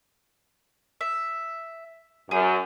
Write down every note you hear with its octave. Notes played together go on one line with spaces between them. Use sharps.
E5
F#2 G#4